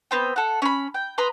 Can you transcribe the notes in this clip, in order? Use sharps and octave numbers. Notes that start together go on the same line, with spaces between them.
B3 C4 G5
A4 F#5
C#4 B5
G5
B4 A#5 C6 D#6